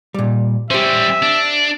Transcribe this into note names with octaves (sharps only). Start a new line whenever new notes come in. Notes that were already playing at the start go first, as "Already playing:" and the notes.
A#2 G3
G3 C#4 G4 C5 E5
D4